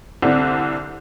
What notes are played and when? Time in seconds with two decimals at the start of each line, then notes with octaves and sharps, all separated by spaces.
0.22 C2 D3 C4 D4